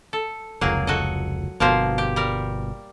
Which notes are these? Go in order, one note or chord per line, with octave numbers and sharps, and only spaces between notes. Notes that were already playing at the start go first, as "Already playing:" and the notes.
A4
F1 C#2 F#3 A#3 G#4
F#4 A4 D#5
G1 B2 F3 A#3 C5
G4
G3 A#4